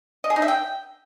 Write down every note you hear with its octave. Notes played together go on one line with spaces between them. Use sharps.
D#5
G#4
D#4
E5
G5